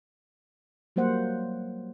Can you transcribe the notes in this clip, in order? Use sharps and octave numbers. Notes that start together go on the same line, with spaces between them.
F#3 G3 A#3 C5 F#5